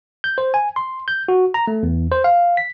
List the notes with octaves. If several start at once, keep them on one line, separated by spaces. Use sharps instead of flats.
G6
C5
G#5
C6
G6
F#4
A#5
A3
E2
C5
F5
B6